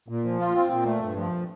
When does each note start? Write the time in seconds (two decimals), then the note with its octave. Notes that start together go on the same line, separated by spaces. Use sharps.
0.08 A#2
0.24 F3
0.39 F4
0.55 C4
0.71 A#2
0.86 A3
1.02 G2
1.17 F3